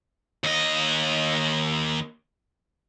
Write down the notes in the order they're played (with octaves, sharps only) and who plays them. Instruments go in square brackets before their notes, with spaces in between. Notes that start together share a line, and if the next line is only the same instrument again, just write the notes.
[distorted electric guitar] D#2 D#5